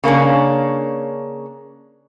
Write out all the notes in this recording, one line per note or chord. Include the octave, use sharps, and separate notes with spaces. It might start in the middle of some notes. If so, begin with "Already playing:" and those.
C#3 A#3 C#4 D4